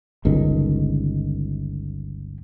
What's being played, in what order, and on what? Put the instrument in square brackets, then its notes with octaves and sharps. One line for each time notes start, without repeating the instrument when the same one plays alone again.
[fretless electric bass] G1 C#2 D#3